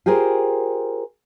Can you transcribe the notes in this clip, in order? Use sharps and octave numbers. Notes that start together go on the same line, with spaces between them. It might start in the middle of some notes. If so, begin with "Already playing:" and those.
F4 G4 G#4 A#4 C5